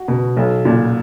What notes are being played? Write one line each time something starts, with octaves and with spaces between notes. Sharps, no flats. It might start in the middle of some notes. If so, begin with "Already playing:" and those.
Already playing: F#4
B2
B1
A#2